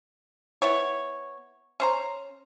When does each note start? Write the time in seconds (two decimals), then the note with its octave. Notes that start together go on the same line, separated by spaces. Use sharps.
0.62 B3 E4 C#5
1.80 C#4 C5 A#5